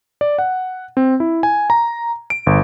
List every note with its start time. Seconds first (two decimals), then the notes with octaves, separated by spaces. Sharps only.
0.21 D5
0.38 F#5
0.97 C4
1.20 E4
1.43 G#5
1.70 A#5
2.30 D7
2.46 G1